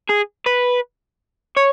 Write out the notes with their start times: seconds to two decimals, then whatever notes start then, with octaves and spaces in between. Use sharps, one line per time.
0.09 G#4
0.46 B4
1.57 C#5